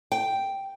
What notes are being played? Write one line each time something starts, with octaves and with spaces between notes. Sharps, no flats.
G5